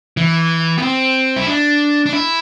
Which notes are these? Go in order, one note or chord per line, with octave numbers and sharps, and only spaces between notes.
E3
B3
C4
E4
D4
D4
E4